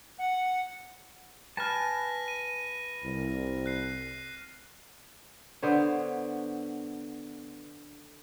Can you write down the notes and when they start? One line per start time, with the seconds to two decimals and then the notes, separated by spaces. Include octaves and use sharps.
0.19 F#5
1.57 B4 G#5 A5 F6 A#6
2.28 D#7
3.04 C2
3.66 F#6 C7
5.62 D3 B3 C5 C#5